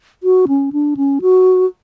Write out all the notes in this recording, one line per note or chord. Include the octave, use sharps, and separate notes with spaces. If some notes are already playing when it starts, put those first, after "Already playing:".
F#4
C#4
D4
C#4
F#4